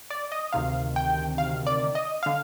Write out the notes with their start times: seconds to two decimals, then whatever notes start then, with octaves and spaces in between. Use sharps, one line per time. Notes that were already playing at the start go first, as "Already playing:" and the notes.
0.10 D5
0.32 D#5
0.53 D2 C3 D#3 F5
0.96 G5
1.38 F5
1.67 D5
1.95 D#5
2.23 D3 F5